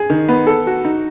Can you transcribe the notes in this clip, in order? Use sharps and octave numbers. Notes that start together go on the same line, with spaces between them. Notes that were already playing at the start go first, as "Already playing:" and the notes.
Already playing: G#4
D#3
B3
A4
F#4
D#4